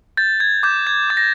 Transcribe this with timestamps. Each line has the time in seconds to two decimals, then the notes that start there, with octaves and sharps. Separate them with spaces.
0.17 G6 A6
0.40 G#6
0.63 D6 G6
0.87 G#6
1.10 D6 A6
1.17 A#6